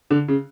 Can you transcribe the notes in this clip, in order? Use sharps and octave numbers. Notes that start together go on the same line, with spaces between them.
D3
C#3